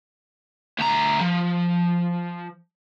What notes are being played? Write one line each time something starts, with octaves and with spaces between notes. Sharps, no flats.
D2 A#5
F3